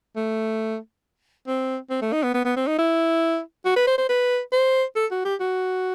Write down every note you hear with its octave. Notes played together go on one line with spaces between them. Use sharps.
A3
C4
C4
A3
D#4
B3
B3
B3
C4
D#4
E4
F#4
B4
C5
C5
B4
C5
A4
F#4
G4
F#4